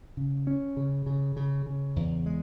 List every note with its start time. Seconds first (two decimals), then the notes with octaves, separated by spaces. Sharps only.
0.17 C#3
0.47 C#4
0.77 C#3
1.06 C#3
1.36 C#3
1.66 C#3
1.96 E2
2.26 G#3